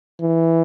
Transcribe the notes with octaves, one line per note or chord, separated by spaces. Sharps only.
E3